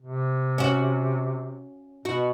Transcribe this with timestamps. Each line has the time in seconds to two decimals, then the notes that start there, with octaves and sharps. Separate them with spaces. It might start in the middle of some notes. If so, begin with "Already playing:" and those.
0.02 C3
0.58 C#4 F#4
2.05 B2 F#4